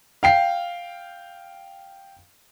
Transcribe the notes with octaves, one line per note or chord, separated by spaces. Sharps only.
F5 G5 C7